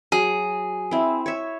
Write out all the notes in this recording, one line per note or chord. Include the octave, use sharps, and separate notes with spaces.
F#3 G#4
C4 E4
C#5 E5